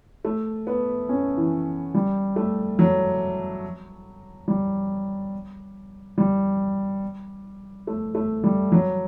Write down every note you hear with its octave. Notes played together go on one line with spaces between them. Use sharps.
A3
B3
C#4
E3
G3
A3
F#3
G3
G3
A3
A3
G3
F#3